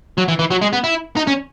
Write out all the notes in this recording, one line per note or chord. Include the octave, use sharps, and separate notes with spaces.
F#3
E3
E3
F#3
G#3
B3
E4
D#4
C#4